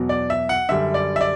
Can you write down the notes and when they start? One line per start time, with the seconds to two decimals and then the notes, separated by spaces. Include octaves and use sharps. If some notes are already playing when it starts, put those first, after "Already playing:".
Already playing: E2 B2 F#3
0.09 D5
0.30 E5
0.49 F#5
0.69 F#2 D3 G3 E5
0.94 D5
1.16 E5
1.21 D5